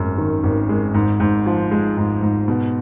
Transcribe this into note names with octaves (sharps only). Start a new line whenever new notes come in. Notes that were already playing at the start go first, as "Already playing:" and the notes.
Already playing: G#1 F#2 G#3
D#3
G#1
G#3
G#2
G#2
F3
G#3
G#2
G#2
B2